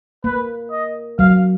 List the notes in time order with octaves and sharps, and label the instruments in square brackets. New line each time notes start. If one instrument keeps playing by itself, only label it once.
[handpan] A#3 [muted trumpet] B4
[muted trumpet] D#5
[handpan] F#3 [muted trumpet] F5